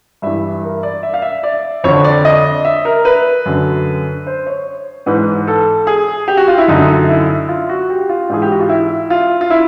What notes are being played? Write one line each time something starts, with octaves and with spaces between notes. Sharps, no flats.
G2 E3 E5
A#4
D5
E5
F5
E5
D5
F2 D3 C#5
D5
D#5
E5
A#4
B4
F#2 D3
C5
C#5
G#2 E3 B4
A4
G#4
G4
F#4
F4
E4
F#2 D3 D#4
E4
F4
F#4
G4
F4
G#2 E3 G#4
G4
F#4
F4
E4
F4
F4
E4